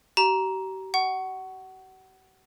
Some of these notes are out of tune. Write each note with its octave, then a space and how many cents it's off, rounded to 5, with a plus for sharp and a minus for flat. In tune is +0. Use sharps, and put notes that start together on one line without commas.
G4 -40 A#5 +10
F#5 +25 C#6 +0